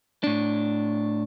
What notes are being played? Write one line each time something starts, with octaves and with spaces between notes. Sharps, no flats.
A2 D4